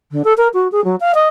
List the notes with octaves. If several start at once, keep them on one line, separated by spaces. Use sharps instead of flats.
D3
A4
A#4
F#4
G#4
F#3
F5
D#5